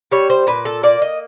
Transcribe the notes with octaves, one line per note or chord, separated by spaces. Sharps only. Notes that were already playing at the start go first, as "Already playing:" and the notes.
G3 C#5
C5
A#2 B4
A4
A#3 D5
D#5